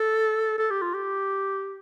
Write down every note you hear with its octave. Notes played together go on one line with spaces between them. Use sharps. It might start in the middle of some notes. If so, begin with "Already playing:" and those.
Already playing: A4
A4
G4
F4
G4